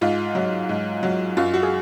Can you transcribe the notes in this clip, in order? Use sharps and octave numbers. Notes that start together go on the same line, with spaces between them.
G#2 F4
F#3
G#2
F#3
F#2 F4
F#4
G#4